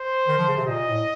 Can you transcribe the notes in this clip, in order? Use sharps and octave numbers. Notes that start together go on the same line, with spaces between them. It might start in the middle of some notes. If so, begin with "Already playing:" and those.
Already playing: C5
D#3
F3
C#3
C3
A#2 D#5
A2